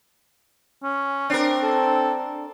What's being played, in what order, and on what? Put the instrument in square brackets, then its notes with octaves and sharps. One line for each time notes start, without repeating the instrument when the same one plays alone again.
[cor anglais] C#4
[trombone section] C4 [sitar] D4 A#4
[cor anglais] A4